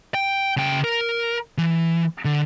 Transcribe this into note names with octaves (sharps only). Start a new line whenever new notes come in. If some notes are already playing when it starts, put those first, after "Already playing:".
G5
C#3 G5
A#4
E3
D3